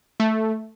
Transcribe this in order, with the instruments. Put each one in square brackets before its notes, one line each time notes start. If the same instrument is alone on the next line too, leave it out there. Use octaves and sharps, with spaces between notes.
[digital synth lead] A3